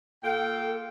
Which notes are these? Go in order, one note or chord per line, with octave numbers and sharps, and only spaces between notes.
A#2 A4 F5 G5